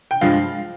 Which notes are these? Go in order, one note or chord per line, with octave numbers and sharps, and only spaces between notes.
G5
G2 F3 G#3 F5